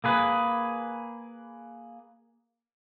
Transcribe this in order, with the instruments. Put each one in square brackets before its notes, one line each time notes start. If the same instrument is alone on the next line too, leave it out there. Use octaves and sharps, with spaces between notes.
[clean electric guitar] A#3 G#4 B4